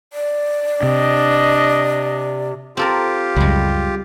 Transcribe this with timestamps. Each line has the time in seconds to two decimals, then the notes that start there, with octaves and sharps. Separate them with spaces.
0.13 D5
0.83 C3 D4 D#5
2.77 C4 F4 G4 A4 A#4
3.36 C#2 F#2 G3 G#3